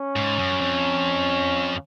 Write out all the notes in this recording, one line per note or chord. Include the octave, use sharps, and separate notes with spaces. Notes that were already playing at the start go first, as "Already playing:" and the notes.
Already playing: C#4
G#2
F#2
F2